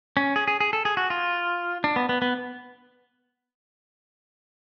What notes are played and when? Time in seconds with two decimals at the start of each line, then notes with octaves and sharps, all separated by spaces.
0.17 C#4
0.36 G#4
0.48 G#4
0.60 G#4
0.73 A4
0.85 G#4
0.97 F#4
1.10 F4
1.84 D4
1.96 B3
2.09 B3
2.22 B3